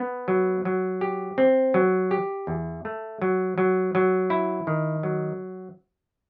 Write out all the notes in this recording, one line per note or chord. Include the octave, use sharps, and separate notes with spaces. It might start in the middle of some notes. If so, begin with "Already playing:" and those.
Already playing: B3
F#3
F#3
G4
C4
F#3
G4
E2
A3
F#3
F#3
F#3
E4
D#3
F#3